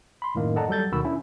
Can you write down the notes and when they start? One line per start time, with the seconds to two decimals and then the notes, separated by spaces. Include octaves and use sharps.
0.22 B5 C6
0.35 F#2 A2 D#3 A#3 D#4
0.56 A4 D5 D#5 F#5 A5 A#5
0.69 F#3 G3 A4 G6 A6
0.92 D2 B2 D#3 F#4 B5 E6
1.04 C#4 D4 E4